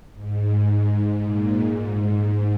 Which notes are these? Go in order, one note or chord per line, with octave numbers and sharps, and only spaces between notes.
G#2
G#2
A#2
G#2
G#2